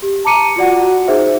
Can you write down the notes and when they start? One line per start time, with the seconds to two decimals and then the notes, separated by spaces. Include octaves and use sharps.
0.02 G4
0.25 A5 A#5 D6 C#7 D#7
0.56 F4 F#4 D5 F#5
0.82 F#4
1.08 D#4 G#4 C5 E5